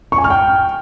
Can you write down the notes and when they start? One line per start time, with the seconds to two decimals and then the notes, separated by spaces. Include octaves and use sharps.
0.12 C#6
0.18 G#5
0.24 F6
0.30 G5